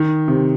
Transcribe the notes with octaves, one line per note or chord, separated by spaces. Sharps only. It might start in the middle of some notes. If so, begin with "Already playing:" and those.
Already playing: D#3
C3